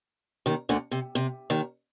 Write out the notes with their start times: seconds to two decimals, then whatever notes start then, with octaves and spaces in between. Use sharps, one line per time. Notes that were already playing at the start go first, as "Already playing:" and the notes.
0.46 D#2 D#3
0.69 D2 D3
0.91 C3
1.15 C3
1.50 D#2 D#3